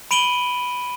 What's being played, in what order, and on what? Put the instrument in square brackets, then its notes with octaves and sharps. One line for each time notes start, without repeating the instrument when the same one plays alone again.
[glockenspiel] B5 D7 D#7 F#7 G7